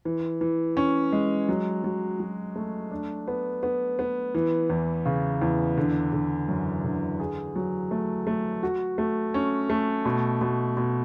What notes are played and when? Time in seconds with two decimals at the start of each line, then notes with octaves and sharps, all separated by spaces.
0.05 E3
0.41 E3
0.77 C#4
1.12 G#3
1.49 F#3
1.84 F#3
2.20 F#3
2.56 A3
2.91 D4
3.28 B3
3.63 B3
3.99 B3
4.35 E3
4.70 E2
5.06 C#3
5.42 E2
5.77 D3
6.13 D3
6.48 F#2
6.84 D3
7.20 G#4
7.56 F#3
7.91 A3
8.27 A3
8.63 F#4
8.98 A3
9.34 C#4
9.70 A3
10.05 B2
10.41 B2
10.77 B2